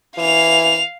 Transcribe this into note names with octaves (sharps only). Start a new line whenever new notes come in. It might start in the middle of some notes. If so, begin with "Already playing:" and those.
E3 F5 F7